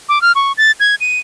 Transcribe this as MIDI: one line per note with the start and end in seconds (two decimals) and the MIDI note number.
0.09 0.21 86
0.22 0.32 89
0.35 0.52 85
0.58 0.72 93
0.80 0.95 92
1.00 1.19 99